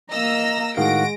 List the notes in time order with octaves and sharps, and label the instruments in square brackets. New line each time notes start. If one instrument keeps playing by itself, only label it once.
[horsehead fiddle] A#3 A#5 [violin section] D#5 E6 A#6
[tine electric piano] A2 D#3 F5 [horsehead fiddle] G#3 [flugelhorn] F#4 [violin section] A#6 D7